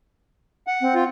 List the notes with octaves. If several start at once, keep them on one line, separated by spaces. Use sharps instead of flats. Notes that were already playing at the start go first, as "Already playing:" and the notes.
F#5
C4
F4